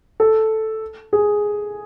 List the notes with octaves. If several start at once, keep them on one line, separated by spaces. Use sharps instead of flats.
A4
G#4